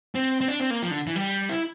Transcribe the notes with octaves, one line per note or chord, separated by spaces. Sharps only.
C4
C4
D4
C4
A#3
F3
D3
E3
G3
E4